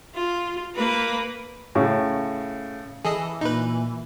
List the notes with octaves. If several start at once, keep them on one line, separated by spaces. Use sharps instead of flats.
F4
A#3 B4
A2 C#3
E3 G#4 A4 D#5
A#2 D#4 B4